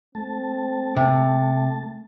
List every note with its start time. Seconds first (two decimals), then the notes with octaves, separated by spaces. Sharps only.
0.15 A3 C4 A5
0.96 C3